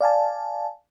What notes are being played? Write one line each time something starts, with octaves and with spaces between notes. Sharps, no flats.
D5 F5 G#5 A5